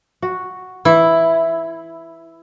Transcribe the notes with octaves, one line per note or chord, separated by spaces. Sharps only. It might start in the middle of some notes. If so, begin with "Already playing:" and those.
F#4
E3 E4